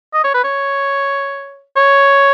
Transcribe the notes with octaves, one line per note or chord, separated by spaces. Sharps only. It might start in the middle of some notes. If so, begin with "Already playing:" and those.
D#5
C#5
B4
C#5
C#5